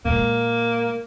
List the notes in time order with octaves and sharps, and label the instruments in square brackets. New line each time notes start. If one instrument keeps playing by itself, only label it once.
[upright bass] A#2 G#3 [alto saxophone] A#3